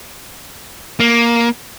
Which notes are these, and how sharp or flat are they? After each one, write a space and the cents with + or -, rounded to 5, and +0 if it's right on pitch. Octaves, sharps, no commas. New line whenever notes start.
A#3 +5